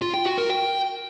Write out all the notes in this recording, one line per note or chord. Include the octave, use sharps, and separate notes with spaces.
F4
G5
F#4
A#4
G5